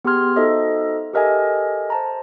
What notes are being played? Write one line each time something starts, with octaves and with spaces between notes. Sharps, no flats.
B3 G4 G#4 C6 F6 G#6
D#4 F#4 A4 C5 D#5 E5
G4 A4 A#4 D#5 E5 G#5
C5 A5 A#5